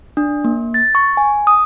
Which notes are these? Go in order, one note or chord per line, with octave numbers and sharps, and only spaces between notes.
D4
A#3
A6
C#6
G#5
D#6